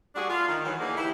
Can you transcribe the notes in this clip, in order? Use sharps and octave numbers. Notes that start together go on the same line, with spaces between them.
G3 A3 D4 F#4 G#4
F4
D#3
E3 F#3
D3 E3 A#3 D#4 E4 G#4
E4 G4